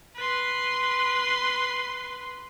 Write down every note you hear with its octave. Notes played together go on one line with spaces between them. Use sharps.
B4 C6